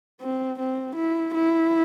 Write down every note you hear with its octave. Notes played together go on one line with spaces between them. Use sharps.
C4
C4
E4
E4